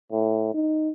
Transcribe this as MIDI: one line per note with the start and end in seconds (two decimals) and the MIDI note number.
0.12 0.49 45
0.54 0.91 63